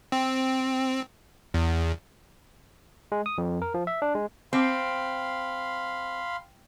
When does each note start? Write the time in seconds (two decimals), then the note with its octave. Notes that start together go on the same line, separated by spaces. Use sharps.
0.12 C4
1.54 E2
3.12 G#3
3.26 D#6
3.38 F2
3.62 A#4
3.74 F3
3.87 E5
4.02 D4
4.15 G#3
4.53 C4 F5 B5 C6